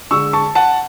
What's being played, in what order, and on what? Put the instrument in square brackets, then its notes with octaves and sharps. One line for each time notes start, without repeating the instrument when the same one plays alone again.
[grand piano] D3 G#3 C#6 E6
A5 C#6
F#5 A5